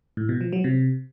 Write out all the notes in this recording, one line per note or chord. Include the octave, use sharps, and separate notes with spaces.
A2
B2
F3
F#3
C3